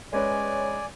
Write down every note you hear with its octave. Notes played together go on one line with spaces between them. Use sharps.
G#3 C#4 B4 C#5 D5 G#5